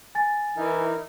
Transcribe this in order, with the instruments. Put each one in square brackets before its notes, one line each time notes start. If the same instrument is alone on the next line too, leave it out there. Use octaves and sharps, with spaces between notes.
[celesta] G#5 A6
[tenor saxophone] E3 [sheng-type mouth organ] D#4 E4 A#4